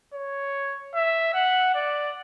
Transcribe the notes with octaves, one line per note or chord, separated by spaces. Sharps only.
C#5
E5
F#5
D5